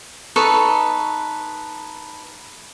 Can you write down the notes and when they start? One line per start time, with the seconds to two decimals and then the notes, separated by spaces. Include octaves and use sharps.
0.36 D#4 A4 B4 C#6